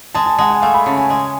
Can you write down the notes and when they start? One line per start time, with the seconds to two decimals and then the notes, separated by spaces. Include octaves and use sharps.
0.15 G#3 A5
0.26 A5
0.38 G#3 F#5
0.51 G#5
0.62 A3 F5
0.74 B5
0.86 C#3 A5
0.97 G#5
1.10 G#3